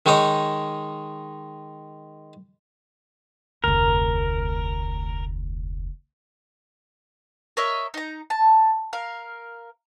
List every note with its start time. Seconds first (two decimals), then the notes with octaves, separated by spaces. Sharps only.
0.06 D#3 G#3 D#4 C#5 D#5
3.64 F1 D2 A#4
7.57 A#4 C#5 D#5 E5
7.94 D#4 A#5
8.30 A5
8.93 A#4 F5